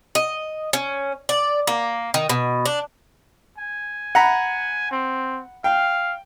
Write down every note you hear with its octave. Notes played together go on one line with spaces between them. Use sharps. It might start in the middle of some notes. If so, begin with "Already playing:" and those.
D#5
C#4
D5
A#3
D#3
B2
D4
G#5
F#5 A#5 B5
C4
F5 G5